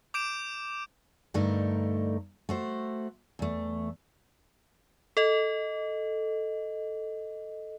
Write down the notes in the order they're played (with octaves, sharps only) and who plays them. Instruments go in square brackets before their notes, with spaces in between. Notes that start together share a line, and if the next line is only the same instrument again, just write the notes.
[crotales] D6 G6 D7 E7
[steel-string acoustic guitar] G2 D3 A3 D#4 A#4
A3 F#4 C5
E2 A3
[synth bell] A4 D#5